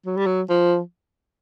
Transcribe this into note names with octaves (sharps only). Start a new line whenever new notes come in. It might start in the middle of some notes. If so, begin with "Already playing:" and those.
F#3
G3
F#3
F3